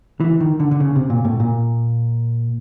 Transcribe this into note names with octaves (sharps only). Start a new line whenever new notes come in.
E3
D#3
D3
D3
C#3
C3
A#2
A2
A#2